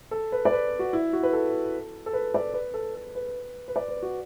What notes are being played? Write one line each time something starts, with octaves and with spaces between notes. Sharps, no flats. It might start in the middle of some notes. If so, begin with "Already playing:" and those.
A4
B4
D5
B4
F#4
E4
F#4
B4
A4
A4
B4
D5
B4
A4
A4
B4
B4
D5
B4
F#4